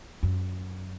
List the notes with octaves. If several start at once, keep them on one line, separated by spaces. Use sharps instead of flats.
F#2